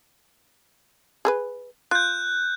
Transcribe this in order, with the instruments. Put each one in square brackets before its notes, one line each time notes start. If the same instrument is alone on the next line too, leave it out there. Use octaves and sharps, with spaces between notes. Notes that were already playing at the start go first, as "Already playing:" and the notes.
[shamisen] G#4 A4 B4
[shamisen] F4 [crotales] F#6 G6